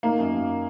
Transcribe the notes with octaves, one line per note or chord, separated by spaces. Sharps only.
D#3 A#3
F#2
F#2